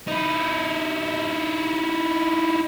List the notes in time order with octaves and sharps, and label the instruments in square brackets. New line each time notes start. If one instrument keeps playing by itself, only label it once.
[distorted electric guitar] D#4 E4